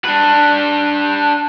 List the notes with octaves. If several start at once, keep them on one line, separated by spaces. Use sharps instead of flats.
D4 B4